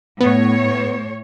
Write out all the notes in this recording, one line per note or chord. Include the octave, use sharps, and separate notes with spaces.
A2 B3 C#5